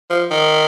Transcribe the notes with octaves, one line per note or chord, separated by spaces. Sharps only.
F3
D#3